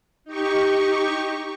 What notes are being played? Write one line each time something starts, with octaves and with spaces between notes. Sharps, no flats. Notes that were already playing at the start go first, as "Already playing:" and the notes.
D#4 G4 C#6